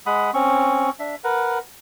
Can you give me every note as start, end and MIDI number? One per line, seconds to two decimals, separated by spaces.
0.06 0.31 56
0.06 0.31 78
0.06 0.31 83
0.06 0.31 87
0.34 0.90 60
0.34 0.90 61
0.34 0.90 85
0.99 1.15 62
0.99 1.15 76
1.24 1.59 70
1.24 1.59 71
1.24 1.59 78